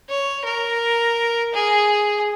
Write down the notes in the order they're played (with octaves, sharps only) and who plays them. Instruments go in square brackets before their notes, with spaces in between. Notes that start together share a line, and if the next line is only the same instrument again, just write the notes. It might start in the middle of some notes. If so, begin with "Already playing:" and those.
[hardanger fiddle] C#5
A#4
G#4